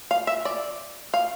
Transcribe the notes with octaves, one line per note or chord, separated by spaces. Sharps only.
F5
E5
D5
F5